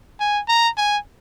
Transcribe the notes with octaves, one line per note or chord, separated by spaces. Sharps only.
G#5
A#5
G#5